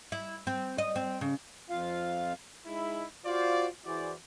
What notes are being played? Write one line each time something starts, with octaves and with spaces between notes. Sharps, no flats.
E4
C4
D#5
C4
C#3
F2 F4 F5
G#3 D#4 E4
F4 F#4 C5 D5
E3 E4 F#4 G#4 C5 D5